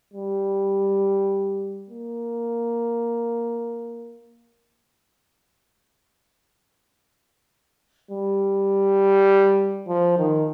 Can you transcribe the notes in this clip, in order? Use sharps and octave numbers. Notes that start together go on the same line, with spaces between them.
G3
A#3
G3
F3
D#3